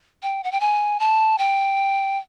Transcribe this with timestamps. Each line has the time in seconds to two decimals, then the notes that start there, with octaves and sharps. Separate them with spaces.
0.23 G5
0.44 F#5
0.52 G5
0.61 G#5
1.00 A5
1.38 G5